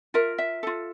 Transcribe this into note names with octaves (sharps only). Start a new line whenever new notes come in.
F4 A#4 E5
E5
F4 A4